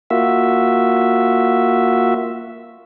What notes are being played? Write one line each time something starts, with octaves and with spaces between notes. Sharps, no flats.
A#3 F4 F#4 E5